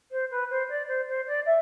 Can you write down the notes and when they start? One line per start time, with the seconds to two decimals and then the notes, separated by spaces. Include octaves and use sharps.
0.11 C5
0.30 B4
0.50 C5
0.69 D5
0.87 C5
1.07 C5
1.26 D5
1.46 E5